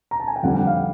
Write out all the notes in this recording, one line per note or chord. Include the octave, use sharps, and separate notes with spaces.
A#5
A5
G#5
G5
F2 D3 G3 F#5
G5
F5